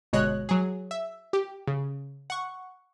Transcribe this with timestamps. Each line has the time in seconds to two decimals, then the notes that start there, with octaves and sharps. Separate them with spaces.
0.13 G1 B2 G#3 C#5 D#5 F#6
0.49 F#3 G#4
0.91 E5
1.33 G4
1.67 C#3
2.30 F#5 C#6